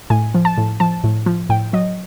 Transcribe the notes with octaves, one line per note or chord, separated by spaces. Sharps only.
A2 G#5
F3
A5
A2
F3 A5
A2
F3
A2 G5
F#3 D#5